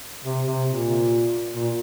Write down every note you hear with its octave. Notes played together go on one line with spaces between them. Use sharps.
C3
C3
A#2
A#2